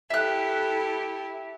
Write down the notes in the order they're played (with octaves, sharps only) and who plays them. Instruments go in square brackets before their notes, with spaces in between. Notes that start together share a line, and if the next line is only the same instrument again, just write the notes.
[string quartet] E4 G4 A4 [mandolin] E5 F#6